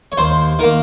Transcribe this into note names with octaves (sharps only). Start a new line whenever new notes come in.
C#5
D#2 C5
D#3 A#3 A#4